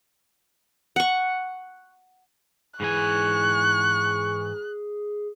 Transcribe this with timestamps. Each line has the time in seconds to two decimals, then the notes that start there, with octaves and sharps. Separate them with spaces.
0.96 F#5 C#6
2.80 G#2 E3 G#4 G#5 C#6 F#6